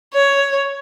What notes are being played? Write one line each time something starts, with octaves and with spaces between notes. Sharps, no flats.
C#5